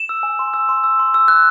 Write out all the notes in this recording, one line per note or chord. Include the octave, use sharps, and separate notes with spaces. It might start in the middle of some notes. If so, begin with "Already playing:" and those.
Already playing: E7
E6
G#5
C6
E6
C6
E6
C6
E6
F#6